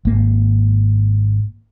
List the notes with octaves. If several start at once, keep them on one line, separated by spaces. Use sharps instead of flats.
G#1 A#3